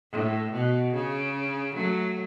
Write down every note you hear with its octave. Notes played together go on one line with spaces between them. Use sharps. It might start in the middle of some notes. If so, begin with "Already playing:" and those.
A2
B2
C#3
F#3 A3